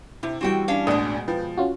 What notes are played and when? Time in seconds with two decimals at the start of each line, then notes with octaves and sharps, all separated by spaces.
0.23 C3 E4
0.41 E3 G3 C4 F#4 G5
0.68 C#4 D4 F5
0.87 A1 D2 B2 G#3 D4 D5 D#6
1.28 F3 B4 G5
1.58 C#4 F4 F#4